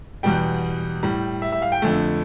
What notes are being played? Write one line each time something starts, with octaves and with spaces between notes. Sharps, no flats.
E2 B2 G3 G5
A2 G3
E5
E5
F5
G5
F2 D3 A3